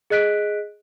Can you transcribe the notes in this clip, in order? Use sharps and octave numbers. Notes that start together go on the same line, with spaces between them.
G#4 D#5 F#6 B6 D7